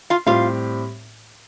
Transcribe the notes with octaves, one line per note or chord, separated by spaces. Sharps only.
F4 F5
A2 G3 C4 F4 G4 F5